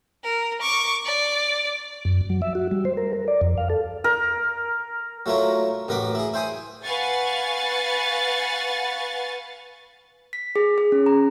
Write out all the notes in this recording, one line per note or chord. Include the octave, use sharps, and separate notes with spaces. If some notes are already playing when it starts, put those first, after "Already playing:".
A#4
C#6 D6
D5
F#2
F#3
E5
F#4
G3
C5
A#4
A#4
D5
F2
F5
A4
A#4
F#3 A3 E4 F4 A#4 C#5
A1 F#2 A#4 B4 F#5 D6
E4 G#4
E4 C5 G5 G#5 D#6
B4 F5 F#5 G#5 C#6 A6
B6
G#4
G#4
C#4
A#5